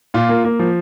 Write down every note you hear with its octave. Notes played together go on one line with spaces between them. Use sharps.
A#2 F4
A#3
A#3
F3